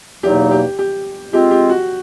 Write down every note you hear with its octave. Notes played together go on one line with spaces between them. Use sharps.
E2 B2 F#3 A#3 D#4 G4
G4
G4
G#3 C4 F4 G4
G4
F#4